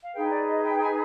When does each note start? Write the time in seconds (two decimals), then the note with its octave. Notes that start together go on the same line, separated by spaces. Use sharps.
0.04 F5
0.13 D#4 G#4 B4 G5
0.30 D5
0.47 D#5
0.64 G5
0.81 G#5